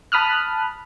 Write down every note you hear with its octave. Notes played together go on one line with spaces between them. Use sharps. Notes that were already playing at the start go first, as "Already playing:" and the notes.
A5 B5 D#6 F6 F#6